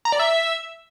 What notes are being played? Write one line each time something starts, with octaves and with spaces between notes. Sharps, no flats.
A#5
D5
E5